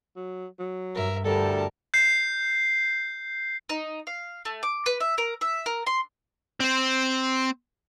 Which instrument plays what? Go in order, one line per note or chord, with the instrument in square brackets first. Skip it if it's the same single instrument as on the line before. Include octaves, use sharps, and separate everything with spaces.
[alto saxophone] F#3
F#3
[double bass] G2 [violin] A#4 E5
[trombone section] D2 G3 [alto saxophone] A4 [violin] A#4 A5
[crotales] G6 C7
[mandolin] D#4
F5
A3
D6
B4
E5
A#4
E5
A#4
C6
[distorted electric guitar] C4 C5